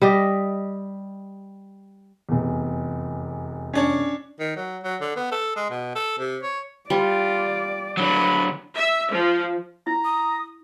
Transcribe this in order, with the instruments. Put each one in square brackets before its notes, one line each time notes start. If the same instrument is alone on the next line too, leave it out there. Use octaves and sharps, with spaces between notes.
[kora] G3 G4 D#5
[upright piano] F1 E2
[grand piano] C#4 D4 C#5
[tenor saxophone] D#3
F#3
F#3
D3
B3
A4
G#3
B2
A4
C3
C#5
[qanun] G3 [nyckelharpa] F4 [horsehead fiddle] D5
[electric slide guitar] D3 F#3 [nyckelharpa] B4 B5
[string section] E5
F3
[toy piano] E4 [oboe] A#5
[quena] D#6